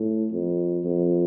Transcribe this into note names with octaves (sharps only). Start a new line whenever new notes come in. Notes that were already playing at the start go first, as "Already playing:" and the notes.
Already playing: A2
F2
F2